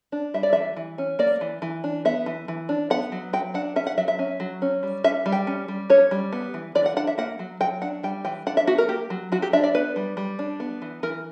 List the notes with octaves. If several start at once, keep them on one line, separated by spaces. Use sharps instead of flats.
D4
G3 E5
D5
E3 E5
E3
C#4
A#3 D5
E3
E3
D4
B3 E5
E3
E3
D4
B3 F#5
F#3
F#3 G5
D4 F#5
C#4 E5
F#5
F#3 E5
E5
C#4
F#3
C#4
G3
C#4 E5
G3
G5
C#4
G3
C#4 C#5
G3
B3
E3
E3 D5
F#5
D4 F#5
E5
A#3 F#5
F#3
F#3 G5
D4 F#5
G3 G5
E3 G5
D4 F#5
E5
B3 F#4
A#4
A#3 G4
F#3
F#3 F#4
G4
D4 E5
D5
B3 B4
G3
G3
D4
B3
E3
E3 A#4